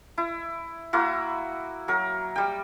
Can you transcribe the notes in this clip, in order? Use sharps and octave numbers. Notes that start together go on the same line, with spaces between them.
E4
A#3 E4 F#4
F#3 A#4
G3 G5